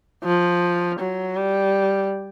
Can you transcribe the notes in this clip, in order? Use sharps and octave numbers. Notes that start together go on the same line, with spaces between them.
F3
F#3
G3